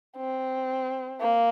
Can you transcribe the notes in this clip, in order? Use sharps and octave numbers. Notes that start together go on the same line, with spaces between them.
C4
A#3